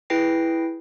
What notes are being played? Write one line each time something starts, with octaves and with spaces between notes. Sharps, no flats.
E4 G#4 B4 G5 A#6 C7